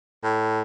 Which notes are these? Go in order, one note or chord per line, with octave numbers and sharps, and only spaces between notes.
A2